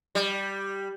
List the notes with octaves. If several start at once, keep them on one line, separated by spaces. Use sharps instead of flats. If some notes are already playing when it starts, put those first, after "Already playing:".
G3